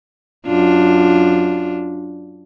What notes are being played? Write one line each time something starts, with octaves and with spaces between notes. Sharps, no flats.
F#2 D4 F4